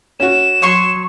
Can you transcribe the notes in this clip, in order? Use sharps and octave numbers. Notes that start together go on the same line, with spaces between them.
C#4 F#4 E7
F#3 C#5 C6 C#6